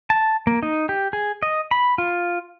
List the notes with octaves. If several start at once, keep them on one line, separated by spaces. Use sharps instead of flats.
A5
A#3
D#4
G4
G#4
D#5
B5
F4